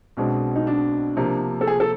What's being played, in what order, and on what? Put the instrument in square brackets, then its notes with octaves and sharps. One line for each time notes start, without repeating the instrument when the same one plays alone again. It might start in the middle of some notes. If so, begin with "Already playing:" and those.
[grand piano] B1 B2 G#3 C4 [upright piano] D4
[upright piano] D#4
D4
[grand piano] C3 F3 A#3
[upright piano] A4
G#4
A4